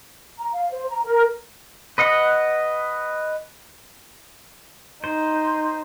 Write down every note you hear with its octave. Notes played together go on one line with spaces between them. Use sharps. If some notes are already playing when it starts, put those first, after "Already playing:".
A#5
F5
C5
A#5
A#4
B4 D#5 F#5
D#4 C5